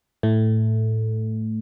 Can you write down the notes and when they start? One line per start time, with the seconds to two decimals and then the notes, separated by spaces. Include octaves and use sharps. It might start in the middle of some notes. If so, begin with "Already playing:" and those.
0.23 A2 A3